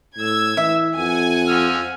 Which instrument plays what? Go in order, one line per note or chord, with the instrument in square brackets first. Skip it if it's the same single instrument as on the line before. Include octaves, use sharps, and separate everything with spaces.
[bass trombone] A2 [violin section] E6 G#6
[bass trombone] E3 [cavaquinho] E5
[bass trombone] F2 [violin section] F#5 G#5
[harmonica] F3 E6 F6